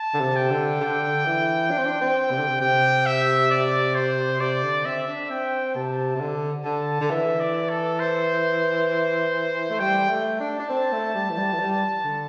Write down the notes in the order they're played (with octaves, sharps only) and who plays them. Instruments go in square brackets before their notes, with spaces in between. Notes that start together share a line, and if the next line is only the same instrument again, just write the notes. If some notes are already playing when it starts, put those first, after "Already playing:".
Already playing: [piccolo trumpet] A5
[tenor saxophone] D3
C3
[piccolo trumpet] G5
[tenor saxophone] D3
D3
E3
D4
C4
D4
C4
C3
D3
C3
[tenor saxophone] C3 [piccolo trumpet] G5
[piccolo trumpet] E5
D5
C5
[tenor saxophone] C3 [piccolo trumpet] D5
[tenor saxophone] D3
[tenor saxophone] C4 [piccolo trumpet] E5
[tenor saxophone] D4
[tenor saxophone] C4 [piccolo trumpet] G5
[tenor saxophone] C3 [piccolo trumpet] A5
[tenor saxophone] C3
D3
[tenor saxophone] D3 [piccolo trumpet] A5
[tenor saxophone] D3
[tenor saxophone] E3 [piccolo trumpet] E5
[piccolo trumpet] D5
A4
C5
[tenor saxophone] A3
[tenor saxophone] G3 [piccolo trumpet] G5
[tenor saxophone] A3
[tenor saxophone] D4 [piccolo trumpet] A5
[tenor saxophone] D4
C4
A3
G3
E3
G3
E3
G3
D3